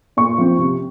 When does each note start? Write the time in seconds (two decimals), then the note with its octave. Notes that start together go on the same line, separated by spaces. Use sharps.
0.17 A#2 C#6
0.38 F3 C4
0.59 C3